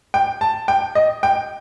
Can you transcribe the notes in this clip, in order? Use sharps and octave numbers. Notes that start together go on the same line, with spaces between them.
G5
A5
G5
D#5
G5